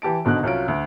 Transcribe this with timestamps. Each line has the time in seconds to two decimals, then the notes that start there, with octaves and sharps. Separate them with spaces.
0.02 E3 G4 A5 D7
0.25 G#1 B2 D3 D#4 F#6
0.43 C2 F#3 C#4 F4 D7
0.68 D2